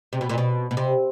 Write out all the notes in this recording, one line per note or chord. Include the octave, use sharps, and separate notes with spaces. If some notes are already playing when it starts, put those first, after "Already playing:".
C3
B2
A#2
B2
B2
C3